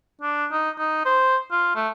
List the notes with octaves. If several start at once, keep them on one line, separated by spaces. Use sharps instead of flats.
D4
D#4
D#4
C5
F4
A3